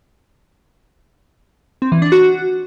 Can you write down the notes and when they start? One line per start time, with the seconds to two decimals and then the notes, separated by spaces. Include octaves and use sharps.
1.82 C4
1.92 E3
2.02 D4
2.12 F#4